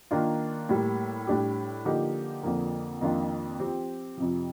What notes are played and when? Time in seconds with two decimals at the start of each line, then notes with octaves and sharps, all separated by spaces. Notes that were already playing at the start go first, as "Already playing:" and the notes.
0.11 D#3 A#3 D4 F4
0.69 A2 G3 A#3
1.27 A2 G3 D4 G4
1.85 D3 F3 A#3 D#4 G4
2.43 F2 D3 F3 A#3
3.01 F2 D#3 A#3 D4 F4
3.60 F3 C4 G4
4.17 F2 C3 F3